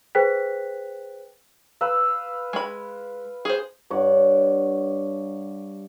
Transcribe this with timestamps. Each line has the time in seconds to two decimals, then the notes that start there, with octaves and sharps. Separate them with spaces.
0.15 G#4 B4 C5 G5 F#6 B6
1.81 B4 F5 E6
2.53 G#3 B5
3.45 G#4 C5
3.90 G2 C#5 D5 F#5